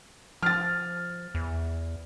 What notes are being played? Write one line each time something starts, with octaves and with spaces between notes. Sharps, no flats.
F3 F6 A6
E2